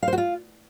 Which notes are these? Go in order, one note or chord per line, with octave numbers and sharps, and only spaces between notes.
F5
C5
F#4
F4